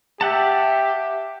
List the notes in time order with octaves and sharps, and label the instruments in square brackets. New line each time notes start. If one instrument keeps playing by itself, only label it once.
[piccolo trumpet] G4 [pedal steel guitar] E5 F#5 A5